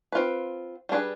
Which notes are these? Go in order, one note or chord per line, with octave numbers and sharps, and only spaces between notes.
C4 F4 B4
G3 D4 G#4 B4